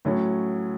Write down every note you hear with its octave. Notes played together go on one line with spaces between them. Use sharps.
A2 F#3 C#4